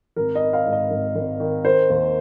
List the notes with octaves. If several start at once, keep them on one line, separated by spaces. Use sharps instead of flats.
G#1 A#4
D#5
D#3
F5
G#2
D#5
G#1
G#1
D#3
D#3 C5
D#2